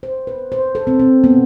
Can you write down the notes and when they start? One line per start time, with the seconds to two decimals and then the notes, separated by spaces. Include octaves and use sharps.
0.03 C5
0.27 B4
0.52 C5
0.75 A4
0.87 C4
1.00 C4
1.24 B3